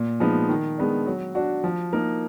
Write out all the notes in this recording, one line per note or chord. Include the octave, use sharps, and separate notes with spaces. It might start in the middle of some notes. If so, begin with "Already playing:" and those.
Already playing: A#2
F3 G#3 B3 D#4
D#3
G#3 B3 D4
F#3
D4 F#4
F3
A#3 D#4 A#4